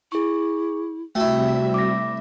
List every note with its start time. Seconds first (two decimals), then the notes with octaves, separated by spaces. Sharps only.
0.12 E4 G#4 C#6
1.15 C3 G3 A3 E4 F#4 E5 G5
1.74 D6 A#6